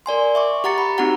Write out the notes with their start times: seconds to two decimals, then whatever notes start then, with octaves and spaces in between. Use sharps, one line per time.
0.06 A#4 D5 G#5 C6
0.35 E5 C#6 D6
0.64 G4 F#5 A#5 A6 C#7
0.78 B5
0.98 C4 D#4 F#4 G4 F#5 A#5